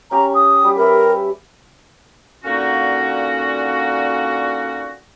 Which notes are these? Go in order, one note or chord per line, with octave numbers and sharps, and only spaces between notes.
C#4 G4 A#5
D#6
G3 G4
G4 A#4 B4 E5
A#2 D3 A#3 C#4 D#4 F#4